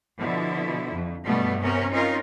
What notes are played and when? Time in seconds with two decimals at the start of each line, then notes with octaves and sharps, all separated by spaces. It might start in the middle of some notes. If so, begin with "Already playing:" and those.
0.17 B2 D3 F3 E4
0.92 F2
1.24 G2 B2 G3 A3 B3
1.61 C3 B3 C#4 A#4
1.90 C4 C#4 D#4 F4 A#4